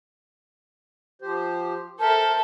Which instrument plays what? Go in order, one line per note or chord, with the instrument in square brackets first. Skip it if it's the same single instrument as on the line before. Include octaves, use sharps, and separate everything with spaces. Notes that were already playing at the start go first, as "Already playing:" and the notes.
[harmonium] F3 G4 C5
[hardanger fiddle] A4 E5 [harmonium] A#4 C5 [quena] A5